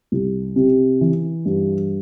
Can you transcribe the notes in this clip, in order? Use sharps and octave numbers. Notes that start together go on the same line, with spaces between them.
C2
C3
E3
G2